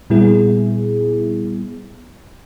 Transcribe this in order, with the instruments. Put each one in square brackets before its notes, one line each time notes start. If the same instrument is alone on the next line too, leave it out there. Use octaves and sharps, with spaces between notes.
[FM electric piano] A#2 G3 B3 E4 G#4